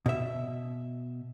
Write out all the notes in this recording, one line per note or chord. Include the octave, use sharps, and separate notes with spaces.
B2 E5